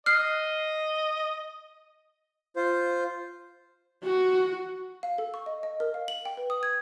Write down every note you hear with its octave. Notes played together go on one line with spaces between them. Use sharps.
D#5 F6 F#6 C7
F4 C5
F#4
F5
A4
C#6
D#5
D#5
A#4
F5
F#7
G5
B4
D#6
G#6